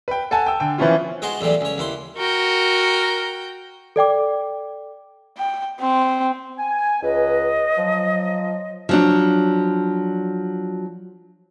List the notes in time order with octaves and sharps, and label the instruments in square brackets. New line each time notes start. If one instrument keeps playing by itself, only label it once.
[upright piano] B4 G5
A4 F#5 G#5 A5
G5 E6
D3 G5
E3 F3 B3 C#4 E4 F4
[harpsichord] G#3 F#4 G#4 A5 C6
E2 A2 F#3 G3
C#2 C#5
D#2 E4 C6
[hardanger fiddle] F#4 G5 [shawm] A#4
[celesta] A4 D5 G5 D6
[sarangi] G5
C4
[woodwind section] G#5
[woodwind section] C#2 B4 [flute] D#5
[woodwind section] F3 F#3
[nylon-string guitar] F3 F#3 D4